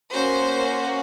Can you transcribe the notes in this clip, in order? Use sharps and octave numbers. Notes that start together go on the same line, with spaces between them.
A#3 C#4 F#4 C5